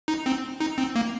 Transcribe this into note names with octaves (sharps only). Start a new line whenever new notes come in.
D#4
C4
D#4
C4
A#3